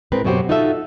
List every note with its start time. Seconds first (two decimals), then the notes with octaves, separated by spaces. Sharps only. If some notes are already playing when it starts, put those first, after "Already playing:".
0.12 A2 G#3 C4 A#4 B4
0.25 F#2 B2 F#3 F#4 G4 C5
0.49 D#4 F4 F#4 A4 E5